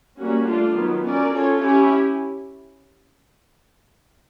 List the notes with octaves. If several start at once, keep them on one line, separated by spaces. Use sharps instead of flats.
G3 A#3 C#4 F#4
A3 D4 F4
D#3 F#3 B3
C#4 F#4 A#4 D5
C#4 F4 A4 C#5
C#4 E4 G4